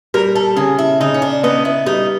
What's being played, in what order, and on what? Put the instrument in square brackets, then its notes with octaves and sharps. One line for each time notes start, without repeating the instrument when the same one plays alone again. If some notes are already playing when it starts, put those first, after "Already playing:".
[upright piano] G3 [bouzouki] A#4
[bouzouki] A4
[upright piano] C#3 [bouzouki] G#4
[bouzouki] E4
[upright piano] C#3 [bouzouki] D#4
[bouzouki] C#4
D4
[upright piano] B3 [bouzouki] D#4
[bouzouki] E4
[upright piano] G3 [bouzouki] D#4